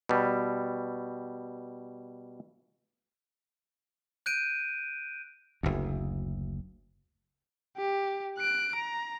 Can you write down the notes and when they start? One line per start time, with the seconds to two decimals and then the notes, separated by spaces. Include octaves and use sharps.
0.09 B2 G3
4.26 F#6 G6 D7 D#7
5.63 F#1 D2
7.77 G4
8.38 F#6 D7
8.76 A#5